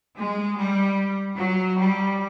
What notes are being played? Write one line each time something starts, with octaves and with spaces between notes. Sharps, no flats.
G#3
G3
F#3
G3